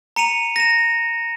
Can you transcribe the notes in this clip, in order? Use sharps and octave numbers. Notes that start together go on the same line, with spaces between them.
A#5 C#7 D#7 F7
A#6 E7